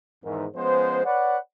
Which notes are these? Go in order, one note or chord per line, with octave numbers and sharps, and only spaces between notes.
E2 G#2 D#3
F3 G#3 B3 C#4 C5
B4 C#5 D5 F#5